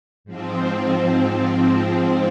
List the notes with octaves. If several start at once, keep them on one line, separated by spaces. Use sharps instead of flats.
G#2 F3 C4